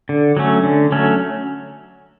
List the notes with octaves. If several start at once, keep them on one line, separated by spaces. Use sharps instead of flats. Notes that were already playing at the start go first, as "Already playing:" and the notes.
D3
F#3 A3 C#4
D3
F#3 A3 C#4